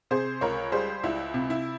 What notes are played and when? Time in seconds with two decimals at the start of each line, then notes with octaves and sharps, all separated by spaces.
0.11 C3 G#4 C5
0.41 C#2 A#4 C#5
0.72 G3 G#4 C5
1.03 C#2 E4
1.34 C3
1.50 E4